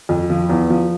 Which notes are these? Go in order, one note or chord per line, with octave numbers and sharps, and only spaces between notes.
F2
F3
E2
F3